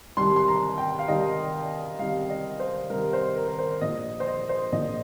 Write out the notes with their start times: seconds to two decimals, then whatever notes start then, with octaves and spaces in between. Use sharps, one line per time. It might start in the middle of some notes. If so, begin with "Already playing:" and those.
0.17 C2 C3 D#3 G3 C6
0.36 C6
0.48 A#5
0.78 G5
0.99 F5
1.08 C2 C3 D#3 G3 D#5
1.99 C2 C3 D#3 G3 F5
2.30 D#5
2.60 C5
2.90 C2 C3 D#3 G3 A#4
3.13 C5
3.36 A#4
3.48 A#4
3.59 C5
3.81 A#1 A#2 F3 D#5
4.20 C5
4.27 D#5
4.49 C5
4.72 A#1 A#2 F3 D#5